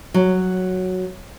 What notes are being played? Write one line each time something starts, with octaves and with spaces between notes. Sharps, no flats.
F#3